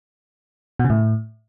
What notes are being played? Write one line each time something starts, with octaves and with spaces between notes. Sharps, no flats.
B2
C#3
A2